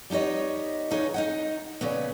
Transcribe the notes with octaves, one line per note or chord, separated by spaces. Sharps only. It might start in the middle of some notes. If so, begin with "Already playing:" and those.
G3 B3 D#4 C#5 D#5
C#3 D#4 B4 C#5
D#4 D#5 F#5
A#2 C#3 B3